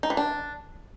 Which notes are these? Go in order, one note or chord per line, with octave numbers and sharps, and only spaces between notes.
D#4
E3
D4